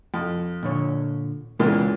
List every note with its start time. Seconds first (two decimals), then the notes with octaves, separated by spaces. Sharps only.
0.14 F2
0.63 A#2 D3 C#5
1.59 C#2 A#2 C#3 E3 B3